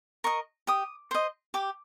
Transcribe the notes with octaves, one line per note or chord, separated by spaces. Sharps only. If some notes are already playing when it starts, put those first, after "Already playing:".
A#4 D#5 C#6
G4 D#6
C5 D#5
G4 D6